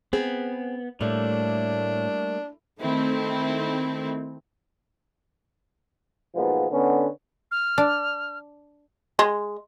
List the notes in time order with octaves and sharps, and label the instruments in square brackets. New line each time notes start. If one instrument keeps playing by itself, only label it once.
[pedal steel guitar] B3 [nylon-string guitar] C4 G#4
[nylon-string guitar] A2 [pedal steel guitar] G3 A3 A#3 [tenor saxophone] D4
[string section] D#3 A3 C4 E4
[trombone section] B1 G#2 F3 G#3 A#3 B3
D3 B3 C#4
[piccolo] F6
[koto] D4
[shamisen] G#3